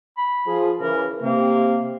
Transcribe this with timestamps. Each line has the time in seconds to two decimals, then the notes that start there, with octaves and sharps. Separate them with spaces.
0.18 B5
0.47 F3 F4 G#4
0.80 C#3 E3 A#4
1.22 C3 A#3